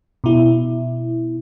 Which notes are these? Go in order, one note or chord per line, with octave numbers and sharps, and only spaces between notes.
B2 E4